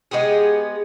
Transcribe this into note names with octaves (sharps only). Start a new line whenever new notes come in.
G#3 B3 G4 G#4